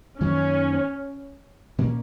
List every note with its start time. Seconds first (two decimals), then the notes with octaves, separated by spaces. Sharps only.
0.20 F#2 D#3 F#3 A#3 C#4
1.78 A#2 A#3 C#4